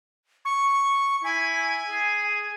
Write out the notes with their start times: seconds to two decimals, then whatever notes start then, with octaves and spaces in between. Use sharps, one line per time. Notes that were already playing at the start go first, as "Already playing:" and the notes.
0.45 C#6
1.24 E4 G#5
1.89 G#4